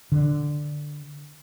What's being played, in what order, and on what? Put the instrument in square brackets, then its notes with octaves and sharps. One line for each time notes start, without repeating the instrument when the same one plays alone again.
[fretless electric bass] D3